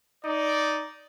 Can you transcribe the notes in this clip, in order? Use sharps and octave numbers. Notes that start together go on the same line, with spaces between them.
D#4 D5